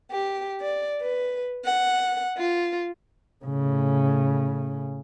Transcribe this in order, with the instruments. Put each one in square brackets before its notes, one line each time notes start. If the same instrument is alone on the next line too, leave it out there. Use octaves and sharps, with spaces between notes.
[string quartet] G4
D5
B4
F#5
F4
[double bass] A2 C#3